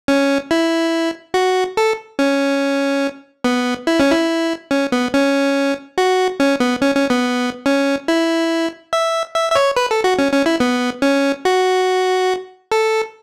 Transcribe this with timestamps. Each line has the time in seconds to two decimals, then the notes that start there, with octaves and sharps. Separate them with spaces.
0.08 C#4
0.51 E4
1.34 F#4
1.77 A4
2.19 C#4
3.44 B3
3.87 E4
4.00 C#4
4.12 E4
4.71 C#4
4.92 B3
5.14 C#4
5.98 F#4
6.40 C#4
6.60 B3
6.82 C#4
6.96 C#4
7.10 B3
7.66 C#4
8.08 E4
8.93 E5
9.35 E5
9.52 E5
9.55 C#5
9.77 B4
9.91 A4
10.04 F#4
10.19 C#4
10.33 C#4
10.46 E4
10.60 B3
11.02 C#4
11.45 F#4
12.72 A4